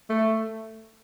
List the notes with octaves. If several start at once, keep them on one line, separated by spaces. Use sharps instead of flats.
A3